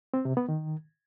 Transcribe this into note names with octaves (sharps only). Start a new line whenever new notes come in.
C4
C3
B3
D#3